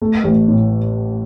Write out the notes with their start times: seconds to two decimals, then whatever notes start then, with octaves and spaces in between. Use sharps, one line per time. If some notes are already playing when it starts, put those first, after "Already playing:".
0.02 A3
0.24 A1
0.48 A2